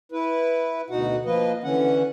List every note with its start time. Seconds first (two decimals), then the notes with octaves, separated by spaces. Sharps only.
0.12 E4 B4
0.90 D2 B2 D#4 F#4 F#5
1.25 F3 A#3 B4 D#5
1.64 D3 E3 C#4 F#5